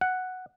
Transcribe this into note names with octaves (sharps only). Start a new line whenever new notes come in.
F#5